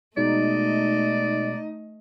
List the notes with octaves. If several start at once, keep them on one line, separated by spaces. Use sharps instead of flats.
B2 G#3 A3 D#4 D5 D#5